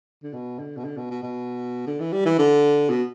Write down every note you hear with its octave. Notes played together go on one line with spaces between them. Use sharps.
D3
B2
D3
B2
D3
B2
B2
B2
D3
E3
G3
E3
D3
B2